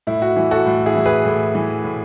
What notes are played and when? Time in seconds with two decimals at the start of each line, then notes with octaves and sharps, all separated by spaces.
0.07 A2 E4
0.22 F#4
0.36 E3
0.51 F#4 A4
0.66 A2
0.86 E4 G#4
0.95 E3
1.05 G#4 B4
1.25 A2
1.55 E3
1.84 A2